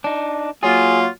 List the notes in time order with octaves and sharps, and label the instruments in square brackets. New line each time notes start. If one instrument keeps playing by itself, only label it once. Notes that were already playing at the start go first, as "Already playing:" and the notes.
[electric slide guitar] D4 D#4
[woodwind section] F#3 A#3 F4 [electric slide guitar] G#4